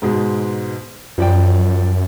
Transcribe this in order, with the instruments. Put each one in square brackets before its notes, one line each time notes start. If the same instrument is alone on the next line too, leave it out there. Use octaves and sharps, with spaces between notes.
[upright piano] G#2 B2 G#3
[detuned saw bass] F#2 [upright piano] F3 D5 G5